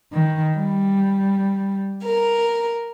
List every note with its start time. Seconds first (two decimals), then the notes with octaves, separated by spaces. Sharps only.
0.12 D#3
0.58 G3
2.06 A#4